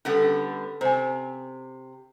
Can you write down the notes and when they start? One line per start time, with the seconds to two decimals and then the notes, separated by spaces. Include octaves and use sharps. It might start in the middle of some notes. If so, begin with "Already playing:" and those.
0.05 D3 G3 B3 C#4 A4
0.81 C3 C5 G#5